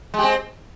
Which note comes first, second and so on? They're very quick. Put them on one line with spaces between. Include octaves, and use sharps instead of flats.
G#3 G4 C4